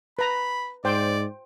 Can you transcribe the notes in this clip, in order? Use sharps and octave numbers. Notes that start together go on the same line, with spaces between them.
B4 A#5 B5
G#2 C5 D5 G5